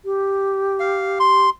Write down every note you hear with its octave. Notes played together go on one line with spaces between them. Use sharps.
G4
F5
C6